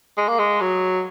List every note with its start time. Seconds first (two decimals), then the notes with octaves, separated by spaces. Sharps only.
0.18 G#3
0.28 A#3
0.39 G#3
0.61 F#3